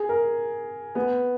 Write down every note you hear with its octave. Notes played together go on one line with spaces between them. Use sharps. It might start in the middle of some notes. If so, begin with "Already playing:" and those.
Already playing: G#4
A#4
B3